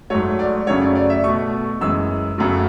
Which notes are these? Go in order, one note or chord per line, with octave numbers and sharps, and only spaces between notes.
G#2 F#3 A3 C#5
D5
F#2 C#3 F#3 A3 C#5
D5
D5
E5
B2 A3 C#6
F#2 E3 G#3 E6
F#2 C#3 F#3 A3